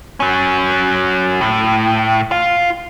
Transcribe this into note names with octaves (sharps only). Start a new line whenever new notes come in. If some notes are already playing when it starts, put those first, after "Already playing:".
F#3 C#4
A2
F4